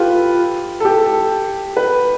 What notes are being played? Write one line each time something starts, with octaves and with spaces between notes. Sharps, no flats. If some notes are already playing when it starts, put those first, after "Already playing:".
Already playing: F4 G4 A4 B4
A4
G4
B4